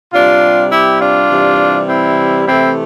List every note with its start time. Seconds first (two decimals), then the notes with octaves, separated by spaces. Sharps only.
0.13 C3 G3 D4 F4
0.71 E4 G4
1.00 D4 F4
1.29 C3 E3 G3
1.88 C4 E4
2.46 C3 E3 A3 C4 E4